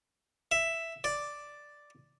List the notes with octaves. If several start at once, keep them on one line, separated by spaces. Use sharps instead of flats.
E5
D5